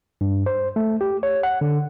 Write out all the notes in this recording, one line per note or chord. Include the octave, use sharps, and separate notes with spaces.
G2
C5
A3
G4
C#5
F#5
D3